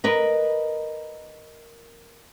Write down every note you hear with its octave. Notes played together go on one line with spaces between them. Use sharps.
A#4 B4 D#5